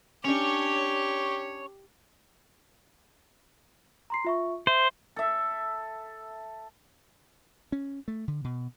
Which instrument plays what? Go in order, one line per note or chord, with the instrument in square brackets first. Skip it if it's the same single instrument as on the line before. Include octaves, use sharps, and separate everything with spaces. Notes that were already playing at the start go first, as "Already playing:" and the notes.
[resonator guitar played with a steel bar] C#4 D4 [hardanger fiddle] G4 [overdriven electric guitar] C#5
[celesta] A#5 C6 C7
F4 E5 C#6
[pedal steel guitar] C5 [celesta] E5
[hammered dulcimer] A4 E5
[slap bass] C#4
A3
D3
B2